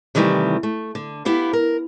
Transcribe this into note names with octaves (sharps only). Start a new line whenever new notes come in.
C3 D#3 E3 G3 A3
A3
D3
B3 E4 G4 F5
A#4